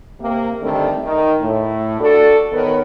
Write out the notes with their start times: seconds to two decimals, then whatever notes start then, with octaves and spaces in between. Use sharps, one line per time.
0.20 C3 A#3
0.61 D3 D#3 G3 A3 C4
1.03 D#3
1.41 A2
2.00 D4 F#4 A4
2.52 D#3 B3 A#4 B4 C#5